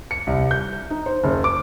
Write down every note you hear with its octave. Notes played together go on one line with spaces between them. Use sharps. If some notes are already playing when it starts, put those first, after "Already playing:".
C#7
C2
G6
D#4
C5
F#1
D6